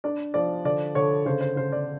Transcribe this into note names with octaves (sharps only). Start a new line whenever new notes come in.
D4 D5
F3 D5
D3 D5
D3 C#5
C#3 C5
C5
C#3 C5
D5